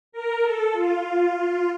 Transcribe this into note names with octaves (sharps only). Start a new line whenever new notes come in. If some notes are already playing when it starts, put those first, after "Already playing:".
A#4
A4
F4